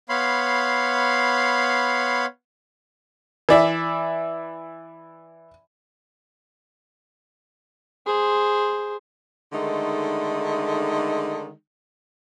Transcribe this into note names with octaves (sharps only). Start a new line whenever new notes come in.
B3 C#5 F5 B5 C6
E3 D5 E5
G#4 C5
D3 D#3 G#3 A3 D#4